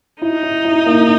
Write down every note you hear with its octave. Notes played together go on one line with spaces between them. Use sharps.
D#4 E4
E4
E4
A#3